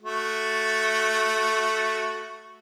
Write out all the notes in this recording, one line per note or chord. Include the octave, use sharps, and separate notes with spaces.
A3 F#4